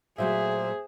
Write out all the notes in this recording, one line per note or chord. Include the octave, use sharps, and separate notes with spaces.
A#2 F#3 A3 G#4 C5 E5